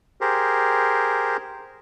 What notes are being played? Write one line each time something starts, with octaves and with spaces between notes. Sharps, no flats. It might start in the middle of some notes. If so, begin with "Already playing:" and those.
G4 G#4 A#4 C5